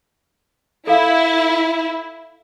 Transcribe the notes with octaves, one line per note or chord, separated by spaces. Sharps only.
E4 A4 F5